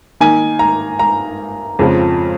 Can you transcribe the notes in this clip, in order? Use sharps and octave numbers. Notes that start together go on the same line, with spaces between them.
D#3 A#3 D#4 G#5
A#5
A#5
F2 C#3 F3 G#3 C4